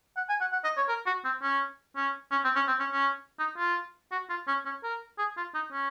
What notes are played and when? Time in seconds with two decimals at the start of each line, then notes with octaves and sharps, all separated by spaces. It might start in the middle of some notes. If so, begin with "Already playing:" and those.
0.17 F#5
0.29 G#5
0.41 F#5
0.53 F#5
0.64 D#5
0.77 C#5
0.89 A#4
1.06 F#4
1.25 C4
1.42 C#4
1.96 C#4
2.31 C#4
2.44 C4
2.56 C#4
2.68 C4
2.80 C#4
2.92 C#4
3.39 D#4
3.58 F4
4.11 F#4
4.30 F4
4.48 C#4
4.65 C#4
4.83 A#4
5.18 G#4
5.37 F4
5.54 D#4
5.72 C#4